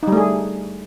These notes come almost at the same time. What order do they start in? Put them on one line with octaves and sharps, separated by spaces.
D#4 G3 A3 G#4